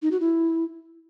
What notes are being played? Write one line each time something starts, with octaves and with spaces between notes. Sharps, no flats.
D#4
F#4
E4